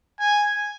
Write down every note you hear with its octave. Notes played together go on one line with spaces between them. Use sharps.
G#5